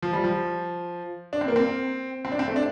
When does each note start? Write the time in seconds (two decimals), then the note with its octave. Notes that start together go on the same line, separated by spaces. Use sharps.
0.02 F3
0.13 G3
0.24 F3
1.33 D4
1.41 C4
1.48 A#3
1.56 C4
2.25 C4
2.32 D4
2.39 C4
2.48 A3
2.56 D4